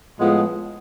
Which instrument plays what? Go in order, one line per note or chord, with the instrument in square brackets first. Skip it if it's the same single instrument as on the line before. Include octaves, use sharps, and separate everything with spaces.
[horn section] A2 F3 G#3 B3